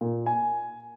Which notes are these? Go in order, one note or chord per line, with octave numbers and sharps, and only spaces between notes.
A#2
G#5